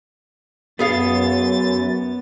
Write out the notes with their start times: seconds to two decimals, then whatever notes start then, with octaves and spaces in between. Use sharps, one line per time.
0.79 F#2 B3 G#4 F5 A6